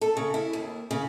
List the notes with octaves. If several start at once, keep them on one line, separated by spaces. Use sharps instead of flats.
A4
C#3
E4
D#2
C#3